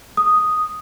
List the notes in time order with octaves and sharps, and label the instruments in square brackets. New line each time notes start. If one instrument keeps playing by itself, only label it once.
[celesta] D#6